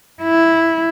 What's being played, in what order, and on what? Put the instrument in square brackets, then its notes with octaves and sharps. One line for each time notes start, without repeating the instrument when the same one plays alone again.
[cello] E4